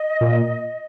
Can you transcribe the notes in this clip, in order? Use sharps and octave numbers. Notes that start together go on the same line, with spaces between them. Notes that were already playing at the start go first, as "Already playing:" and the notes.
Already playing: D#5
A#2